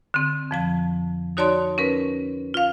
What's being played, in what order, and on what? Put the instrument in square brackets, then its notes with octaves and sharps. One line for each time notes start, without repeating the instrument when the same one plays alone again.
[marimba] D3 C4
F2 F3 A5
D#4 F#4 C#5 D5 A5 C6
C#4 A#4 B4
F4 F5